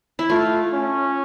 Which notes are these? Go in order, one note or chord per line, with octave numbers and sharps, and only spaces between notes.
E4
A3 F4
C#4